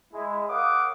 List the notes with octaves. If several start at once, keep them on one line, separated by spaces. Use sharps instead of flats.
G#3 E4
A#4 C#5 F5 F#5 D6 D#6